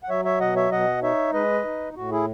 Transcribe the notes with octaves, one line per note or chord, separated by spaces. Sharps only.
F#5
F#3 C#5 E5
C#5 E5
B2 D#5 F#5
C#5 E5
B2 D#5 F#5
D#4 C#5 E5
G#3 B4 D#5
D#4
A2 F#4
E4 G#4